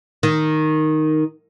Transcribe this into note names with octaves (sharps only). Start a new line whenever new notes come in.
D#3